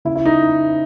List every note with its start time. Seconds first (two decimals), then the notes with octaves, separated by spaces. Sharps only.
0.05 C#3 E4
0.15 E4
0.25 D#4